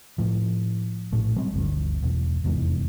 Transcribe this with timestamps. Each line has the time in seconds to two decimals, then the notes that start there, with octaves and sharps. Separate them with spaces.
0.18 A2 F3
1.12 A#1 A2 A3
1.36 F#3 G3 C4
1.53 G1 D2 G2
2.03 E1 B1
2.44 F1 E2 G#2